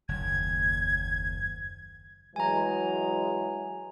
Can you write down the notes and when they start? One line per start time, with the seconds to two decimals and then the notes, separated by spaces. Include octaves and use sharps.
0.09 F#1 D#2 G#6
2.36 E3 F#3 G#3 G#5 A#5